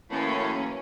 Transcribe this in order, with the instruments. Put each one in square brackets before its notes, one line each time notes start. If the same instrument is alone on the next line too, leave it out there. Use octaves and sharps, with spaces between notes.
[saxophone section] F#2 A2 [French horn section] E3 F#3 A#3 [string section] C#4